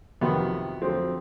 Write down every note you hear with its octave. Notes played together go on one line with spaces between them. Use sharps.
F2 C3 D#3 F#3 B3
F2 D3 F#3 C4